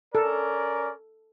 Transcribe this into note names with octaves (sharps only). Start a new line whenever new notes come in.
C#4 A4 A#4 D5